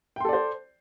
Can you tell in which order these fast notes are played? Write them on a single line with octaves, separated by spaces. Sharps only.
G5 C6 A4 D5 C5